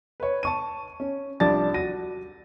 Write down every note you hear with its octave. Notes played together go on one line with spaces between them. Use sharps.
B4 C#5
A5 C#6 D#7
C#4
C2 F3 D4 D5 A5 A6
F#4 A#6 D#7